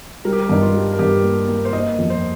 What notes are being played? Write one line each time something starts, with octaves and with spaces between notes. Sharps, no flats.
G3 A#4
G4
A#4
G2 D#4
F4
G3
A#4
G2 G4
A#3
A#3
C5
A#3 D#5
F2
C5